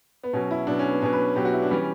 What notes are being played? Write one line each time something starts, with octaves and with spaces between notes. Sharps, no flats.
B3
B2 F#3 C#4
E4
B2 F#3 D4
C#4
B3
B2 F#3 C#4
B4
B2 F#3 G4
F#4
E4
D4
E3 G3 C#4